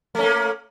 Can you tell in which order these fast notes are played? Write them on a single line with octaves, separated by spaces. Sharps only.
A3 C#4 A#3